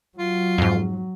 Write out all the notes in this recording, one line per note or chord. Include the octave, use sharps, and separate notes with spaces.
F#3 F4
F2 G#2